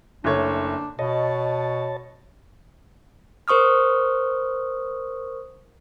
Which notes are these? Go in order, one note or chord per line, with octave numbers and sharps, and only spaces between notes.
F#1 A3 D4 C#5
B2 C#5 D#5 A5
A#4 C5 C#6 D#6 F6